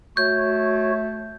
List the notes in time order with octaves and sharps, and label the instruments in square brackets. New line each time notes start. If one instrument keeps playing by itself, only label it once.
[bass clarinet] A3 [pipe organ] F#4 C#5 [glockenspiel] G6